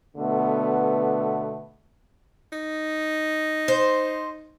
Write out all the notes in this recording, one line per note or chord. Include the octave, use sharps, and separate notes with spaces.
B2 D3 A3 B3
D#4
C5